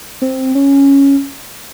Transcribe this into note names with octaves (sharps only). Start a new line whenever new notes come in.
C4
C#4